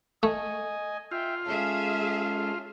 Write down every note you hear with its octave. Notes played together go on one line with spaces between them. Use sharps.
A3 D#5 G#5
F4 E5 G5
G#3 C#4 G#4 A4 E5 F5